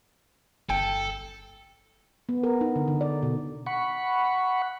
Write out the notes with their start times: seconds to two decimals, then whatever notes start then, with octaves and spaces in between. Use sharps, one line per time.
0.70 G1 A4 G5
2.29 B3
2.43 A#4
2.61 D#4
2.76 D3
2.88 D3
3.01 D5
3.23 B2
3.66 F#5 B5 C#6